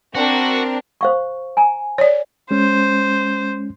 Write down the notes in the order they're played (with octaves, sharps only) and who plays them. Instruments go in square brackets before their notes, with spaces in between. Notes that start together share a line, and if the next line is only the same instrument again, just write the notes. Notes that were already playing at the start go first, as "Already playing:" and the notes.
[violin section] C4 D4 A#4 [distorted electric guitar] F#4
[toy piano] C5 F5 C#6
G#5 A#5
[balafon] C#5 D5
[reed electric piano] G#3 C#4 [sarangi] C5